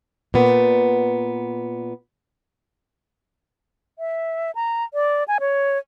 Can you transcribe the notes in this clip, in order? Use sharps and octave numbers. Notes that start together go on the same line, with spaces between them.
A#2 B3
E5
A#5
D5
G#5
C#5